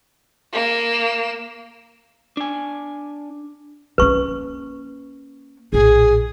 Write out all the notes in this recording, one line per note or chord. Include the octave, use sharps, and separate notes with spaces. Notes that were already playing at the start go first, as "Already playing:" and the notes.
A#3 E7
D4 G#5
A#3 C#4 B4 C#6
A#1 A2 G#4